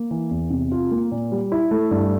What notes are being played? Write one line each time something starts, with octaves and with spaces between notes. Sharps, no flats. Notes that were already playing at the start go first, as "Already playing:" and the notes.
Already playing: A#3
E3
E2
C3
F4
A#3
A#2
G3
E4
A3
G2